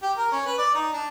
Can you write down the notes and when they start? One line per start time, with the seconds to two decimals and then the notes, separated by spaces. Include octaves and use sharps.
0.02 G4
0.17 A#4
0.32 C#4
0.46 B4
0.58 D5
0.74 D#4
0.93 D4